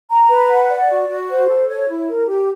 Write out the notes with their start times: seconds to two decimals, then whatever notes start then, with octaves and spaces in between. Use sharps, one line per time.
0.10 A#5
0.30 B4
0.50 F#5
0.70 D5
0.88 F#4
1.09 F#4
1.29 C5
1.49 A4
1.68 C#5
1.88 E4
2.08 A#4
2.28 G4